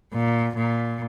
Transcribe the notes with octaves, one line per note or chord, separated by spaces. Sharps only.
A#2
A#2